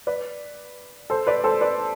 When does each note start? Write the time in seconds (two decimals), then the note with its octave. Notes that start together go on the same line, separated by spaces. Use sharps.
0.07 B4 D5
1.10 A4 C5
1.27 B4 D5
1.44 A4 C5
1.61 B4 D5